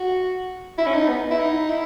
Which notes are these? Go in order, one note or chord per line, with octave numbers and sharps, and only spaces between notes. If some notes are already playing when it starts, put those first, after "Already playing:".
Already playing: F#4
E4
C#4
D#4
B3
E4
D#4
E4